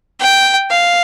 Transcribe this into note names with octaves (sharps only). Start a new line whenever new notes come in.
G5
F5